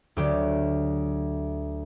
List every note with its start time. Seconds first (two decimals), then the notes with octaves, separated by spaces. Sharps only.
0.16 D2 F#3 G4